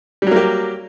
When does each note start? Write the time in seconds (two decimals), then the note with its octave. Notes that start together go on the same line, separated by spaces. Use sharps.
0.22 G3
0.27 F#3
0.31 A#3
0.36 G4